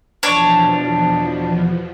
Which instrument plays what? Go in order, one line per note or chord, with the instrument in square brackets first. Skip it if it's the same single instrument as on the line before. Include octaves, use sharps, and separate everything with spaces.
[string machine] E2 B2 F3 [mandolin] D4 C#5